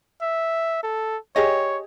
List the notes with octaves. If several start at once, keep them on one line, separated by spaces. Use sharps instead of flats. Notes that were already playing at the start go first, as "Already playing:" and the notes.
E5
A4
G4 G#4 C#5 D#5